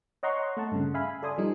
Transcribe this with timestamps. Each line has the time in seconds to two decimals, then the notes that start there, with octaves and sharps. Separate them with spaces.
0.23 C#5 D#5 F#5 A#5 C6 C#6
0.57 A3 F#5 A5
0.71 G2 C#3
0.94 E5 F5 G#5 B5
1.23 A4 D5 G#5 C6 D#6
1.38 F3 G3 D#4